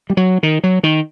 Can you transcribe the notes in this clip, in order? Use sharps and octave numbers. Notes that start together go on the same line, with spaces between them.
G3
F#3
D#3
F#3
D#3